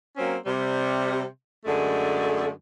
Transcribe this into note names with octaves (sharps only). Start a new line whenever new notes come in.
F#3 A#3 C4 C#4
C3 G3
F#2 D3 G#3 A3